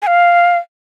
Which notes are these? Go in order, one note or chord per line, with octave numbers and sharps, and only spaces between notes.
G#5
F5